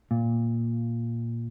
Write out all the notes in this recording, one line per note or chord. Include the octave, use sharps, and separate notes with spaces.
A#2